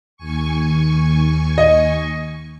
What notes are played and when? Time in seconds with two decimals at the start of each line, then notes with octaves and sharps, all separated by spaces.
0.17 D#2 G#5 C#6
1.58 D#5